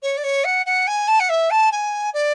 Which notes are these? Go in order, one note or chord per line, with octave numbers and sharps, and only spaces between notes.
C#5
D5
C#5
F#5
F#5
G#5
A5
F#5
E5
A5
G#5
D5